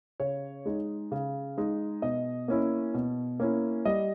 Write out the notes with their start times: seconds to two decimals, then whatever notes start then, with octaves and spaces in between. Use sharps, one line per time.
0.20 C#3 C#5
0.65 G#3 D#4
1.12 C#3
1.58 G#3 D#4
2.02 B2 D#5
2.48 A#3 C#4 E4
2.94 B2
3.40 A#3 C#4 E4
3.85 G3 D#5